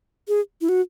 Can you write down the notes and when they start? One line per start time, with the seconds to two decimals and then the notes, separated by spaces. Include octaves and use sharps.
0.28 G#4
0.61 E4
0.69 F#4